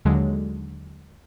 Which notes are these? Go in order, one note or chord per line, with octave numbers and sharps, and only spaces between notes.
D#2 D3 F#3 G#3